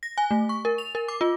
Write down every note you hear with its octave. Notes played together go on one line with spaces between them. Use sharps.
A#6
G#5
A3
C#6
A#4
F7
A#4
D6
F4